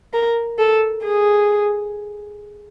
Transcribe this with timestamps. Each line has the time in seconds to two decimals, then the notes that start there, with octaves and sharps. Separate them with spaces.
0.13 A#4
0.58 A4
1.03 G#4